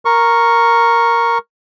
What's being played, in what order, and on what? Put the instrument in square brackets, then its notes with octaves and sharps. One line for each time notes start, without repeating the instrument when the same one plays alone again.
[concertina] A#4 C#6